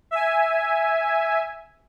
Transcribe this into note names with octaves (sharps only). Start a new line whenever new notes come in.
E5 G#5